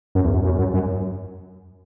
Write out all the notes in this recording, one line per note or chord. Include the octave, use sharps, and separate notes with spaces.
F#2
E2
F#2
F#2
F#2
F#2